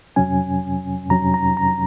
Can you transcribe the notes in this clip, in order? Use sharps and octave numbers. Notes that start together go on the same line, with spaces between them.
F2 C3 F#3 C#4 G#5
F2 C3 F#3 C#4 A#5
A#5
A#5